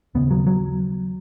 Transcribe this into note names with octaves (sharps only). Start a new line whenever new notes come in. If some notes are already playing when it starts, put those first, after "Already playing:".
D#2 C#3 B3
F#3
F#3